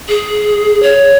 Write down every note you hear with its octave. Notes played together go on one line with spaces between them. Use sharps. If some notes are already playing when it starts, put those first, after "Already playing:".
G#4
C#5